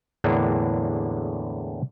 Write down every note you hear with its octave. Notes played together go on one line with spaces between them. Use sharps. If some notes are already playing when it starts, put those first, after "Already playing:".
E2 A2 D3 G#3 A#3 D4